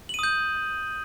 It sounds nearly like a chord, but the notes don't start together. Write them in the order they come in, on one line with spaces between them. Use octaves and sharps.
F#7 D#7 D#6 G6